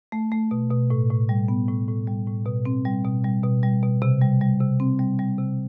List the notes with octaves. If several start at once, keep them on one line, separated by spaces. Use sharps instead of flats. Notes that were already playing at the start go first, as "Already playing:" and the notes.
A3
A3
B2
B2
A2
A2
G3
B3
A2
A2
G3
A2
B2
C4
G3
B2
G3
B2
G3
B2
C3
G3
G3
C3
C4
G3
G3
C3